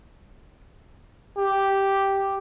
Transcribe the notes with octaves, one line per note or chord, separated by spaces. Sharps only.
G4